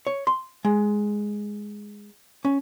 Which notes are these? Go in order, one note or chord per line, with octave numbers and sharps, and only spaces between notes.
C#5
C6
G#3
C#4